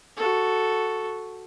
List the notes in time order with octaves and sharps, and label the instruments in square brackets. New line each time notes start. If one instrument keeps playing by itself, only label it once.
[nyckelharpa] F#4 A4